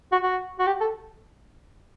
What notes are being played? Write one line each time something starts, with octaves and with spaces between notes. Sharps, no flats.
F#4
F#4
F#4
G4
A4